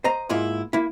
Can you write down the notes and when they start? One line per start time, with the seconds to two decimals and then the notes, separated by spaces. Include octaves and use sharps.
0.04 C5 D#5 A#5
0.29 G#2 A#3 E4 F4
0.73 A#3 E4